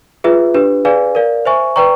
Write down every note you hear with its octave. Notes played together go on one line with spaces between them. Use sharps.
F4 G#4 B4 E5
D4 G4 B4
G#4 B4 D5 F5 G#5
A#4 D5 F5
C5 E5 G#5 C#6
B4 D5 G5 A#5 C#6